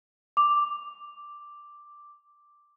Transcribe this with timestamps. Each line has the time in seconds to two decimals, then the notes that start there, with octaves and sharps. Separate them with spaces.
0.37 D6 F7